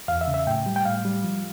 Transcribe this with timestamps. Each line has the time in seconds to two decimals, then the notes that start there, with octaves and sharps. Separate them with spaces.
0.08 E2 F5
0.21 E5
0.28 C#3
0.34 E5
0.47 A2 G5
0.66 G3
0.76 G5
0.85 A2 F5
1.05 G3
1.24 F3